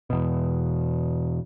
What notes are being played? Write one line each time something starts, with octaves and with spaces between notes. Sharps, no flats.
E2 B2